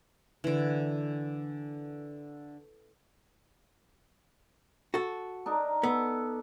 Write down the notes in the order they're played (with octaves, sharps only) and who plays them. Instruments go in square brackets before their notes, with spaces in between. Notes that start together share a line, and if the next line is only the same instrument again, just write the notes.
[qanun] D3 E3
[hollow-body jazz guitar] F#4 A4
[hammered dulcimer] D4 D#4 A#4
[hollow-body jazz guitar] B3 [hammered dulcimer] A4